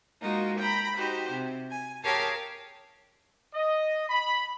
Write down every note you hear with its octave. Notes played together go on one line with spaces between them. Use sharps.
G#3 A#3 D#4 F4 F#4
G5 A#5 B5
D#4 F#4 G4 C5
C3
G#5
G4 G#4 A#4 C#5 F5 A5
D#5
B5